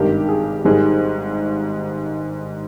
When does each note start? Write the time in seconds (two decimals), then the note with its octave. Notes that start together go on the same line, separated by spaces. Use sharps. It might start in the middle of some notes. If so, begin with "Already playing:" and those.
Already playing: G#1 G2 D#3 G4
0.29 G#4
0.65 G#1 G#2 D#3 G3 G#4